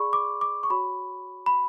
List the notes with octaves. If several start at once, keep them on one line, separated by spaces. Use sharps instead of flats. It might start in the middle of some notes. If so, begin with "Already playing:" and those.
Already playing: G#4 D5 B5 C#6
D6
D6
C#6
F#4 C#5 B5
B5